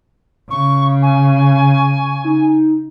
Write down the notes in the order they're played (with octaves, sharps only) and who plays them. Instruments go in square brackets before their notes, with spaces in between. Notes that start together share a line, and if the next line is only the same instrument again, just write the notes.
[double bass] C#3 [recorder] C#6
[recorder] G#5 [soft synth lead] C#6
[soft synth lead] D#4